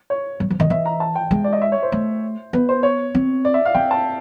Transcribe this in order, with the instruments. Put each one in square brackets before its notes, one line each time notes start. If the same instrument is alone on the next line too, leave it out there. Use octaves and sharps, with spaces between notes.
[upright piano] C#5
[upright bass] F#3
F3
[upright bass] D#3 [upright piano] D#5
[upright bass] E3 [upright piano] E5
[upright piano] A#5
A5
G5
[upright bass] G#3
[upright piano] D5
D#5
E5
C#5
C5
[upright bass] A3
[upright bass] B3 [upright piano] B4
[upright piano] C5
C#5
[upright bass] C4
[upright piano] D5
E5
F5
[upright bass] C4 [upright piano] G5
[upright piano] A5